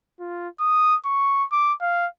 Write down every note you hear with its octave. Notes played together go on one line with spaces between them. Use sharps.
F4
D#6
C#6
D6
F5